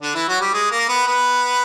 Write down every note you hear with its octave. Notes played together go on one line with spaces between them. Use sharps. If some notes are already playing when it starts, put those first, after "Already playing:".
D3 D4
E3 E4
F#3 F#4
G3 G4
G#3 G#4
A#3 A#4
B3 B4
B3 B4